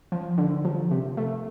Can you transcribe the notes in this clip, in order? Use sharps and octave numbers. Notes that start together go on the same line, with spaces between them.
F3
D3
F3
C3
A3